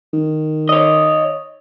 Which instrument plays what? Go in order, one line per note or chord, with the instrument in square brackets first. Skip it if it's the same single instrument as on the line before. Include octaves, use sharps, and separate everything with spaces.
[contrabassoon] D#3
[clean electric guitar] C#5 D#5